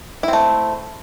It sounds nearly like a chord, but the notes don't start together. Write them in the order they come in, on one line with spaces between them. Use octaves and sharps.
E4 C4 A3